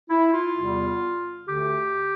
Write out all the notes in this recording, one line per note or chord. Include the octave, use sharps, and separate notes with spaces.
E4
F4
E2 C3 G3 B3
D2 D3 A3 G4